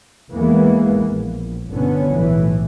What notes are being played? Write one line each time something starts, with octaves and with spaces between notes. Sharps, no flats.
E2 E3 G#3 A#3 B3
A#1
G1 B2 D3 B3 C#4
B1 A2 E3